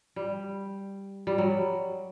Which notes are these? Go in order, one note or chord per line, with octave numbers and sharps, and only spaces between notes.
G3
G3
F#3